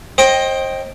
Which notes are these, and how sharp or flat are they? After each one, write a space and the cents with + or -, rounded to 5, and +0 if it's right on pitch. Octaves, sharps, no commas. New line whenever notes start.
C5 +30 D#5 +0 G5 -5